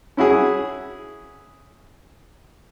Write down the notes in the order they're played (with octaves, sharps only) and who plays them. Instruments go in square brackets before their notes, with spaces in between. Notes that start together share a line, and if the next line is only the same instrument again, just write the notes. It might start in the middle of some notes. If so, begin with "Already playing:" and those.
[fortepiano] C#4 E4 F#4 G#4